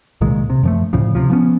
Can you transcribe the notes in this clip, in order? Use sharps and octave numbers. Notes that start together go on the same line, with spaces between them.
C2 A#2 D#3 G#3
C3
F#2 F3 A3
D2 A2 C#3 F3
C3 F3
F3 B3 C#4